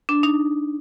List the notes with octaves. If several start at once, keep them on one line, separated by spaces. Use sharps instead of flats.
D4
D#4